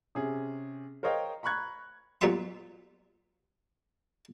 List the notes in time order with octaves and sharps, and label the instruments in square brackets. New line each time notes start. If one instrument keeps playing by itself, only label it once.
[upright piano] C3 C#4 G#4
A#4 C5 C#5 D#5 F5 G5
A#5 B5 C#6 F#6 G#6
[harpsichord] A#2 F#3 G3 B3 E5 C6